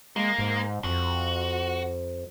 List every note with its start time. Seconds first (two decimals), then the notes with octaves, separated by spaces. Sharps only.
0.16 G#3 A#3
0.39 G#2
0.84 F2 F#4